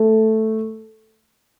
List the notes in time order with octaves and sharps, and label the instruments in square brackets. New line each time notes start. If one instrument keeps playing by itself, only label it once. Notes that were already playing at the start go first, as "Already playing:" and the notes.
Already playing: [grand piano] A3